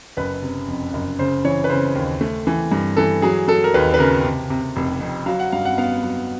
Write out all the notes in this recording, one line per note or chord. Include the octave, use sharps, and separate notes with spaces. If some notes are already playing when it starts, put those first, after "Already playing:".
F#1 B4
C3
F2
F#1
C#3 C5
E3 C#5
B4
C#3 C5
D#2
A3
E3
G2
E3 A4
F#3 G#4
F#3 A4
A#4
D#2 B4
B4
C#3 A#4
C3
C3
F1
F2
F#3 F5
F#5
G2 F5
F#5
B3 F5
F#3